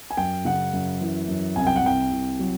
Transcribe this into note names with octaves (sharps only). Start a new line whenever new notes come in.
G#5
F#2 G5
C#3 F#5
F#2
E3
F#2
C2 G#5
G5
F#5
C2 G5
C2
F#3